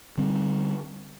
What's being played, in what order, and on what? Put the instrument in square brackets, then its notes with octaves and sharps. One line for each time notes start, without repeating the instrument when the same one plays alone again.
[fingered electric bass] D3 G3 C4